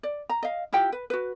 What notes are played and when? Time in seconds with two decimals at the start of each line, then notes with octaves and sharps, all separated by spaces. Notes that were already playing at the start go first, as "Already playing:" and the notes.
0.03 D5
0.29 A#5
0.43 D#5 F5
0.73 E4 F4 G4 G5
0.92 B4
1.10 F#4 B4